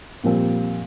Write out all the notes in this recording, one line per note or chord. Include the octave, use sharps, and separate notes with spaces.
A#2 F3 G3 C4